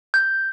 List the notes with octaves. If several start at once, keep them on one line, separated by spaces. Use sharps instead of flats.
G6